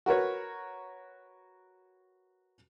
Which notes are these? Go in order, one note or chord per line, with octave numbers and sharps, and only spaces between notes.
F#4 A#4 B4 C#5